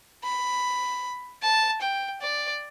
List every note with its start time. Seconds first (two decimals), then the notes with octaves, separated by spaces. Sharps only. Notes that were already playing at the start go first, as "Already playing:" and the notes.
0.24 B5
1.42 A5
1.81 G5
2.21 D5